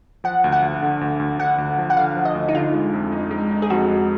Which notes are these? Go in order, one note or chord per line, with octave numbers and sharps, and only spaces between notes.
F3 F#5
D2
F#5
D2
D3
D2
D2
D3 F#5
D2
F3
F#5
D3 F5
F3
D#5
D2
D#4
D3 F4
G#3
F2
D#4
G#3
D#4
G#4
F2 F#4
G#3